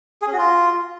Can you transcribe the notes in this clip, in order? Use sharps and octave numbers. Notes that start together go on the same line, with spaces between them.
G#4
C#4
F#4
F4